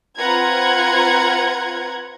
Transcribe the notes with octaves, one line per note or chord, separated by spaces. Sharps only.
C4 F4 B4 F#5 A#5 G#6